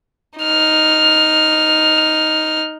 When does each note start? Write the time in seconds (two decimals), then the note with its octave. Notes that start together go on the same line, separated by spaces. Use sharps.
0.39 D#4 F6